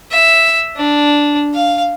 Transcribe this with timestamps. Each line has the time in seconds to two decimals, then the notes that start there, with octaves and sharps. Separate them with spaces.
0.11 E5
0.76 D4
1.54 F5